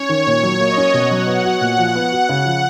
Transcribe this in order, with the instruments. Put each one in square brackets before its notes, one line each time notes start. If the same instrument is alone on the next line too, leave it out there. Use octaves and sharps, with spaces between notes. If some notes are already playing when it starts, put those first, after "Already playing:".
Already playing: [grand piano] C#4 [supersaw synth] C#5
[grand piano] D#3
A#2
F#3
[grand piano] A#3 [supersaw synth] D#5
[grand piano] C#4
[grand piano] B2 [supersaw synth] F#5
[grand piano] F#3
B3
F#4
A#2
F3
B3
F#4
C#3
F3